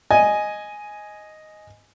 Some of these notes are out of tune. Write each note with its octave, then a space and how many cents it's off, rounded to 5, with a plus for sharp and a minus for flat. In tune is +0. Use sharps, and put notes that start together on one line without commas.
D#5 +0 G#5 +5